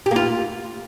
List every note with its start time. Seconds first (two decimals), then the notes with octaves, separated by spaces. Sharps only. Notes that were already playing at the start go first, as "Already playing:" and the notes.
0.06 G4
0.11 A#3
0.16 F4